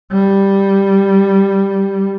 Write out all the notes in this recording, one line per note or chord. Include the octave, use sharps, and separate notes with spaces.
G3